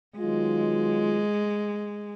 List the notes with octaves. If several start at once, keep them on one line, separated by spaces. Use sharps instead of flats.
D#3 F#3 G#3 B3 F4